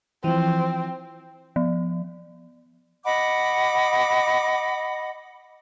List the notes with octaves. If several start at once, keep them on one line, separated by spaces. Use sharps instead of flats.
E3 F3 C4
F3
D#5 F#5 B5 D6